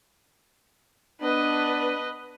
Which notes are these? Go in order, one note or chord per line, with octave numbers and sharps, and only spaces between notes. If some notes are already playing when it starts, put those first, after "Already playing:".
B3 D4 B4 D#5